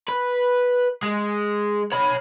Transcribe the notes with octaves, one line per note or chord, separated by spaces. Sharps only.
B4
G#3
C#5 B5